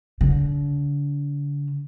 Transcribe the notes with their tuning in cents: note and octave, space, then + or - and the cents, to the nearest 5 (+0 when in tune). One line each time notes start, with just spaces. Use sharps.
D3 -40